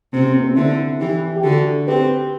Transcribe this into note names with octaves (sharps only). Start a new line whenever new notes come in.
C3 C4
C4
B3
C4
D3 C4 E4
E3 E4 G4
G4
D3 F#4 A4
C4 G4 B4